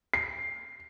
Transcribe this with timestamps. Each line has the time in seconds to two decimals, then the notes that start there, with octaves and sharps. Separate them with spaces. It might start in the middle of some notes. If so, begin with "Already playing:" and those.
0.14 C7